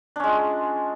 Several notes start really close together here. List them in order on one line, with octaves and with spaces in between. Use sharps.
D4 C#4 G#3 F4